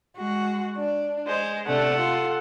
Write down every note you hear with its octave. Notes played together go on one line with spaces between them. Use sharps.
G#3 F#4
D4
G#3 C5
C3 A3 D4 A4 F#5
F4